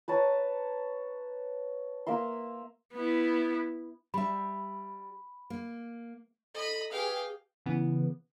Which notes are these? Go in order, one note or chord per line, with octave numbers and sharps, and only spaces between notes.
B4 C#5 A5 A#5
A#3 A#4 E5 C6
B3 E4
G3 E5 B5
A#3
A4 D#5 B5
G4 G#4 B4 F5 G5
C#3 E3 B3